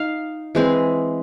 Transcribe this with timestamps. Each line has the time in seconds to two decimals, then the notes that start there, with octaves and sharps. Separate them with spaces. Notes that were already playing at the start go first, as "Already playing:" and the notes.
Already playing: D#4 F5
0.55 E3 G#3 C4